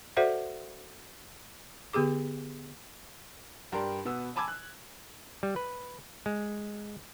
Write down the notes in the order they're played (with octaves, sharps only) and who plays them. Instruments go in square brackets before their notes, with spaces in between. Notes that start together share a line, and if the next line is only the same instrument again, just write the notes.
[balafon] F#4 A4 C5 D5 E5 F#5
D3 B3 G4 G#4 D6
[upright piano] G2 D4 G4 A#4 C6
B2 B3 E6
G#5 A5 B5 D6 E6 G#6
F#6
[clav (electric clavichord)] G3
B4
G#3